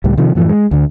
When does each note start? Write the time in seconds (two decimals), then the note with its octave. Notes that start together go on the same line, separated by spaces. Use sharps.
0.04 C#2 A2 G3
0.18 C3 D#3 F3
0.35 F#2 A2 E3 F3
0.49 G#3
0.71 D2 D3